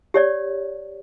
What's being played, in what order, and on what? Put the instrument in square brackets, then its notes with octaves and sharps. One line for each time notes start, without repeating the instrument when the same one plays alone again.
[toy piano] G4 C#5 D5